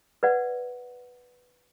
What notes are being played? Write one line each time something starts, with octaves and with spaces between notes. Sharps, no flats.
B4 D5 F#5